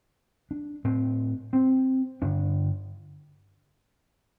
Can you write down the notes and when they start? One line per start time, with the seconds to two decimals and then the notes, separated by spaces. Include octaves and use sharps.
0.51 D4
0.84 A2 C4
1.53 C4
2.22 G2 D3 D4